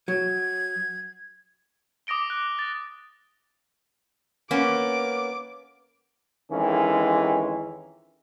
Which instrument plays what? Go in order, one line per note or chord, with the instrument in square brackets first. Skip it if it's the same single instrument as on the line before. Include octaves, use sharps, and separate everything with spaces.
[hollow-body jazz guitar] F#3 [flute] G#6
[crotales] D6 D#6 A#6 D7 G7
F#6
A6
[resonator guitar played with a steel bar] A#3 B3 C#4 [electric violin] D6
[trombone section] F2 D#3 E3 G#3 C#4